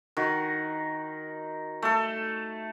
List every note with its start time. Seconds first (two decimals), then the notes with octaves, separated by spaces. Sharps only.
0.17 D#3 F#4
1.82 A3 A4